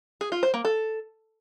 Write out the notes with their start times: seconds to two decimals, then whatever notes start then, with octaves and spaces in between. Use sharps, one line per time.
0.21 G#4
0.32 F4
0.43 C5
0.54 A#3
0.65 A4